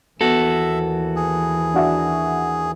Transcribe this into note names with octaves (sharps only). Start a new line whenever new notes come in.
D#2 E3 B3 F#4 A4 E5
G#4
D4 F#4 E5